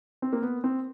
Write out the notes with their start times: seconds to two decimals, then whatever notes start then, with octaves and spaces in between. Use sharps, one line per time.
0.22 C4
0.33 A#3
0.42 B3
0.64 C4